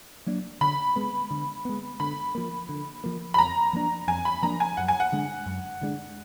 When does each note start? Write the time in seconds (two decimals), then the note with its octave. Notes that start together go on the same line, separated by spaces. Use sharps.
0.26 F#3 A#3 D4
0.61 D3 B5
0.96 G#3 B3
1.31 D3
1.65 G#3 B3
2.00 D3 B5
2.35 F3 A#3
2.69 D3
3.04 F3 A#3
3.34 B5
3.38 F2 A#5
3.73 F3 A#3 D4
4.08 F2 G#5
4.25 B5
4.42 F3 A#3 D4 A#5
4.60 G#5
4.77 F#2 F#5
4.88 G#5
5.00 F#5
5.12 D3 G#3 D4
5.46 F#2
5.81 D3 G#3 D4